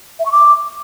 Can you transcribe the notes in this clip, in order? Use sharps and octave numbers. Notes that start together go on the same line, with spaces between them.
E5
C#6
D6